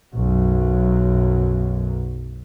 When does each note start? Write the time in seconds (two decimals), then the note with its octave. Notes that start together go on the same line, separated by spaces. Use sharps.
0.13 B1 F#2 F#3